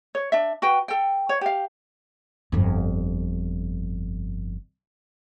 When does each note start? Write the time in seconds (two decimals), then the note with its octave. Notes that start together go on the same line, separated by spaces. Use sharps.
0.15 C#5
0.32 D4 E5
0.62 F#4 B4 G5
0.88 A4 G5
1.29 C#5
1.41 G4 F5
2.52 G1 F2